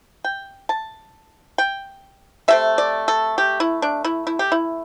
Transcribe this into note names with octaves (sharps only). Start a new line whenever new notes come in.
G5
A5
G5
C3 A3 C4 E5
D5
A4
G4
E4
D4
E4
E4
G4
E4